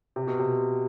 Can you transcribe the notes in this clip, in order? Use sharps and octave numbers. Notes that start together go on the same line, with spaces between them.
C3
B2
C3